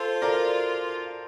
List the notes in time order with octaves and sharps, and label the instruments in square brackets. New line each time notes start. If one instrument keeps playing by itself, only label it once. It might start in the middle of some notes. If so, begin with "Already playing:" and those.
Already playing: [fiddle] F4 [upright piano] A4 C5
[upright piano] A#4 D5